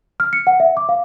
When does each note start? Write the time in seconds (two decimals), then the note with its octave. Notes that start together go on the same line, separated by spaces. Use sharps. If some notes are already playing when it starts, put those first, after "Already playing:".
0.20 F6
0.33 C#7
0.47 F#5
0.60 E5
0.77 D6
0.89 F5